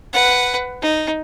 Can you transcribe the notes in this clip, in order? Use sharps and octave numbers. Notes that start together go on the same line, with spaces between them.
B4 F#5
D#4